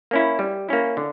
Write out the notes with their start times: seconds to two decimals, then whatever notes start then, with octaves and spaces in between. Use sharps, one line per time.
0.11 A#3 C#4 E4
0.39 G3
0.69 A#3 C#4 E4
0.97 D3